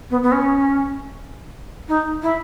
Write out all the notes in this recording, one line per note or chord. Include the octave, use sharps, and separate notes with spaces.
B3
B3
C#4
D#4
E4